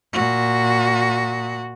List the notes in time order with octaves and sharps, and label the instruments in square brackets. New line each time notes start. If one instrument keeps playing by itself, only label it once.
[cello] A#2 F#4